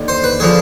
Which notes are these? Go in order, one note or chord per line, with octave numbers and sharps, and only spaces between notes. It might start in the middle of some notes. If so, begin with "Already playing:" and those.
Already playing: D#2 D3
C5
B4
D3 F3 G#4